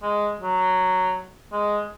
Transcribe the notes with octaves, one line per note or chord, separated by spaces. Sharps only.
G#3
F#3
G#3